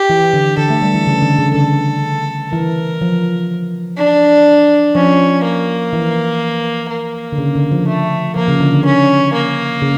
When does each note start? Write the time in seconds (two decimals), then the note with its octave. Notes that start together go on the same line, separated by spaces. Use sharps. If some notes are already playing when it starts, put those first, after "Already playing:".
Already playing: G4
0.10 E3
0.33 D3
0.57 D3 A4
0.70 A3
0.82 G3
0.94 E3
1.07 C#3
1.22 D3
1.39 C#3
1.55 D3 A4
2.52 E3 A#4
3.01 F3
3.98 D4
4.95 F3 C#4
5.44 A#3
5.93 E3
6.90 A#3
7.32 D3
7.38 C#3
7.55 D3
7.72 F3
7.87 A3
8.35 F3 A#3
8.48 C#3
8.60 D3
8.73 D3
8.85 C#4
9.33 A#3
9.82 C#3